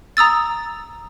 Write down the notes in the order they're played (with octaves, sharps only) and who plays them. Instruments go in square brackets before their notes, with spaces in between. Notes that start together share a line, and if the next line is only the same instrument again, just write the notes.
[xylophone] A#5 D#6 E6 A6